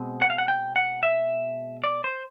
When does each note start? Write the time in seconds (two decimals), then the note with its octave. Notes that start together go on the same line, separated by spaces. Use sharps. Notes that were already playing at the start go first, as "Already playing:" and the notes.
Already playing: B2 G#3 C4
0.22 F#5
0.30 F5
0.38 F#5
0.48 G5
0.76 F#5
1.03 E5
1.84 D5
2.04 C5